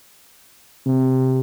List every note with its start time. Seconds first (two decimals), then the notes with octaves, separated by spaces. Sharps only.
0.86 C3